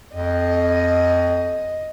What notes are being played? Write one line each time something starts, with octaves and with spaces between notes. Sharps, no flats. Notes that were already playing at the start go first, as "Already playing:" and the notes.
F2 D#5